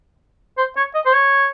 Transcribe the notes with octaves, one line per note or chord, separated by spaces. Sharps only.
C5
C#5
D#5
C5
C#5